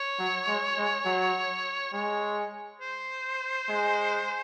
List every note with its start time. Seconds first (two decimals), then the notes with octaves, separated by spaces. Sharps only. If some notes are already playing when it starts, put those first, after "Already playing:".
Already playing: C#5
0.19 F#3
0.47 G#3
0.77 G#3
1.05 F#3
1.93 G#3 C#5
2.81 C5
3.69 G#3